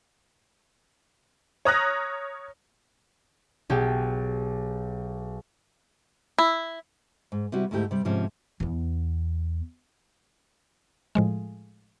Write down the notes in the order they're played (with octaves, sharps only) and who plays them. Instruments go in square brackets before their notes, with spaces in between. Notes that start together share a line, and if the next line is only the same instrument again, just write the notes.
[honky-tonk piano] C#5 A#5 D#6 F6 F#6 A#6
[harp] B1 G4 G#4
[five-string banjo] E4
[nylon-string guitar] G#2
C3 G3 E4 F#4
D2 G#2 A3 E4 G4 E5
C3 G3
G#2 C3 F3 C4 C#4
[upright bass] E2 B3
[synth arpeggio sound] A2 F3 G#3